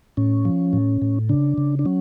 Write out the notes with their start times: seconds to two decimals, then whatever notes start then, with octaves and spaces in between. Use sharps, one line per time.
0.17 A2 C#4
0.45 F3
0.73 A2
1.02 A2
1.29 C#3 D4
1.58 C#3
1.79 D4
1.85 F#3 C#4